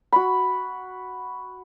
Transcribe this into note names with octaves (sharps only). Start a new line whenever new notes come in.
F#4 B5